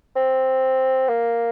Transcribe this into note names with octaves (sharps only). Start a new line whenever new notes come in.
C4
A#3